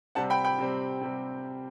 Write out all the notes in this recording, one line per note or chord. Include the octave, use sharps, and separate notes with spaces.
C3 G3 C4 F#5 A5
G5 B5
G5 B5
C3 G3 C4
C3 G3 C4